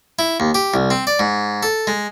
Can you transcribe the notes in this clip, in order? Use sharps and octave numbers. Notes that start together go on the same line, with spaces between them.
E4
D#2
G4
C2
C4
D5
G#2
A4
G#3